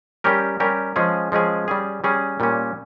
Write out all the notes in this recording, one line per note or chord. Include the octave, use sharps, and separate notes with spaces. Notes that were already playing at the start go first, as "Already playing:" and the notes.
G3 C#4 G4 A#4
G3 C#4 G4 A#4
F3 G#3 C#4 G#4
F3 G#3 C#4 G#4
G3 C#4 G#4
G3 C#4 G#4
A#2 G3 C#4